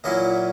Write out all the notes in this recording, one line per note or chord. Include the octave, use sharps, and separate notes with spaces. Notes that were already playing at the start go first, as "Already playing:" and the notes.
A#2 F#3 C#4 E4 D#5